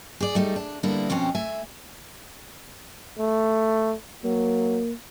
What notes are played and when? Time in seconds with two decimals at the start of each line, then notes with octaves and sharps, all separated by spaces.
0.20 G#4 D5
0.35 G3 A3 D#4
0.56 D4
0.83 D3 G3 A#3 B3 E4
1.10 F2 B2 C4 C#4
1.35 A3 E5 G#5
3.19 A3
4.24 F#3 A#3